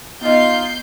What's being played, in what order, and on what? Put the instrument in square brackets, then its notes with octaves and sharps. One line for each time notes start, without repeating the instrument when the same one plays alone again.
[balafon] B3 D#5 [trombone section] D#4 F4 [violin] G6 C7